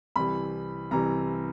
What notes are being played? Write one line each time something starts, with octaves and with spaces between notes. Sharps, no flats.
C2 C3 E3 B5
C2 C3 E3 A#5